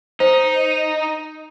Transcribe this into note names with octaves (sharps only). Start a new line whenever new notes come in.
D#4 C5